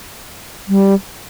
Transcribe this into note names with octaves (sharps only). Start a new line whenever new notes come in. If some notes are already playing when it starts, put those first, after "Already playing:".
G3